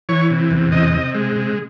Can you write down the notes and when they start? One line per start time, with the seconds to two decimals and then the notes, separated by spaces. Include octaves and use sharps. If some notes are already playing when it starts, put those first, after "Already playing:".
0.09 E3 C#5
0.30 C3
0.51 E2
0.72 C3 D#5
0.93 C3
1.15 G#3
1.36 C3